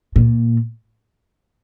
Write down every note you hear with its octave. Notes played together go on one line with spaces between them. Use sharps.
A#2